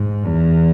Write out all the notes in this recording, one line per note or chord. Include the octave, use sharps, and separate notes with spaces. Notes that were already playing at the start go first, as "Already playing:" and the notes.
Already playing: G#2
E2